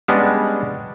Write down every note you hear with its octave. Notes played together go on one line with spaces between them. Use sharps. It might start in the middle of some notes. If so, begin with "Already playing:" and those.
G3 G#3 B3 C#4 D4